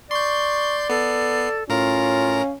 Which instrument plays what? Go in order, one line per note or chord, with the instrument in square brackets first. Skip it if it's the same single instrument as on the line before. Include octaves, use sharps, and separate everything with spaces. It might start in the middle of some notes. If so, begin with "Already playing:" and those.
[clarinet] D5 [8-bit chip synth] C6 G6 [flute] C#6
[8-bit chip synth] B3 C7 [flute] A4
[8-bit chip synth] A2 A#4 A#5 [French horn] C#4 [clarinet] F4 [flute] F5